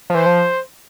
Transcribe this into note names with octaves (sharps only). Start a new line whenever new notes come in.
F3
E3 C5
F3